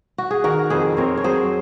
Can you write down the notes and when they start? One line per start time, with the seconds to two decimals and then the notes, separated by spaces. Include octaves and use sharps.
0.18 F#4
0.31 G#4
0.44 D#3 F#4 A#4
0.70 F2 G#4 C5
0.97 C4 A#4 C#5
1.17 C#5
1.24 F#3 G#4 C5